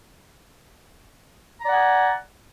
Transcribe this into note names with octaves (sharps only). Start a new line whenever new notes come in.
D5 F#5 G#5 A#5